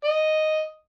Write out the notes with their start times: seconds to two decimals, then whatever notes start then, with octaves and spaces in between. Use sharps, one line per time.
0.04 D#5